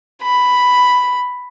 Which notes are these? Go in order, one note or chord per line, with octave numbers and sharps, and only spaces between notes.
B5